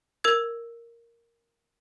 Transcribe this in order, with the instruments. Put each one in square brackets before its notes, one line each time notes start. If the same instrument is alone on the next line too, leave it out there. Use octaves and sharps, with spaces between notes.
[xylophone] A#4 E6 G#6